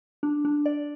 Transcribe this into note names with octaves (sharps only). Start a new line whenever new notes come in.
D4
D4
D5